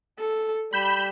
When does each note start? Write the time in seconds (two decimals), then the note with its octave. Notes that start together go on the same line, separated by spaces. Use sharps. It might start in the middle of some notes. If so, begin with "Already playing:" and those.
0.19 A4
0.73 G3 B5 G6 E7